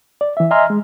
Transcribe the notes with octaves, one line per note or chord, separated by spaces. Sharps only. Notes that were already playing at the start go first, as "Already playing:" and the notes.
D5
E3 E5
D#5 E5 G#5 A#5 C6 F6
G#3